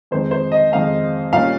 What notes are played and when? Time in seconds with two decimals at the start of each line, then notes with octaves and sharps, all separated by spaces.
0.11 F2 D#3 G#3 C4 C5
0.31 C5
0.52 D#5
0.72 F2 D#3 G#3 C4 F5
1.33 A#2 G3 C#4 F5